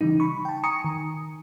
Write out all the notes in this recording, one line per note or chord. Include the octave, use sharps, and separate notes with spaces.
C#3 E3 G3 D#4
B5 C#6
G5 A5
G#5 A#5 C#6 D#6 C#7
D#3